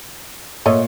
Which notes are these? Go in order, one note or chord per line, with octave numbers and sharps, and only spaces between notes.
A#2 A3 C#5 D#5